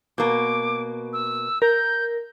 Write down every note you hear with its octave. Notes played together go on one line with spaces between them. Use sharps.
B2 A#3 D6
E6
A#4 G6